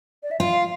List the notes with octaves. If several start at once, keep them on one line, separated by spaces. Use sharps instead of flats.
D5
E5
F4 F5